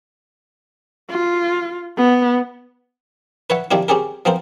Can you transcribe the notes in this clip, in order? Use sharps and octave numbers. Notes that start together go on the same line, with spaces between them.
F4
B3
B4 C#5 E5 F#5
D#3 F3 G3 C4 E4
C4 C#4 G4 G#4 A#4
F3 B3 C4 A#4 C5